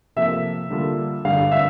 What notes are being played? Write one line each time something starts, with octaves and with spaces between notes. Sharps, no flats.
C3 F3 A#3 F4 A4 E5
D3 G3 A#3 F4 A4
G2 D3 G3 D4 F5
E5